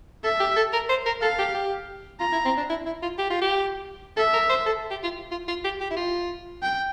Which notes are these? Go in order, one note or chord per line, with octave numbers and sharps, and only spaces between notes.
A4 E5
G4
A4
A#4
C5
A#4
A4 F5
G4
G4
F4 A#5
E4
C4
D4
E4
E4
F4
G4
F4
G4
A4 E5
A#4
C5
A4
G4
F4
F4
F4
G4
G4
E4
F4
G5